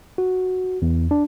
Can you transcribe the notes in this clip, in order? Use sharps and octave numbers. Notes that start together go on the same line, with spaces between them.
F#4
E2
D4